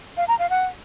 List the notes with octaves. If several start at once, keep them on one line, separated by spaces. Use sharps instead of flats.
F5
A#5
F5
F#5